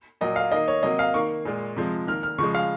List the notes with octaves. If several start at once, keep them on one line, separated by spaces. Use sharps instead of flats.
A#2 F#3 A#3 D#5
F5
D#3 A#3 D#5
C#5
C3 F#3 A#3 D#5
F5
D#3 A#3 C#6
A#2 G#3
C3 F3 G#3
D#3 A#3 F6
F6
C#3 F3 G#3 C#6
F5